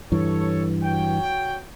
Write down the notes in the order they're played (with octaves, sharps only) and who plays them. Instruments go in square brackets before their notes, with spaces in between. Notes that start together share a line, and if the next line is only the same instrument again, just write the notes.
[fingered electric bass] G2 E3 [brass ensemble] A4 C#5
[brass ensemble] F#4 C#5 G5